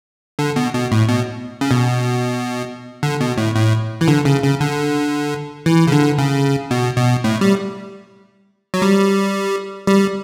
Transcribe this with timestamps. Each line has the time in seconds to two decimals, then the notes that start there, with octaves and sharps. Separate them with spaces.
0.39 D3
0.56 B2
0.74 B2
0.92 A2
1.09 B2
1.61 C#3
1.71 B2
3.03 D3
3.21 B2
3.37 A2
3.55 A2
4.01 E3
4.08 D3
4.25 C#3
4.43 C#3
4.60 D3
5.66 E3
5.87 C#3
5.92 D3
6.18 C#3
6.71 B2
6.97 B2
7.24 A2
7.41 G3
8.74 F#3
8.82 G3
9.87 G3